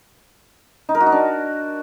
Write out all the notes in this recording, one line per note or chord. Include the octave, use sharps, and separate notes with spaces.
D#4
A#4
F#4
D#4
D4